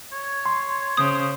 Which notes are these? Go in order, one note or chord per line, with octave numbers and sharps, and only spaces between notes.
C#5
C6
C#3 C5 D#6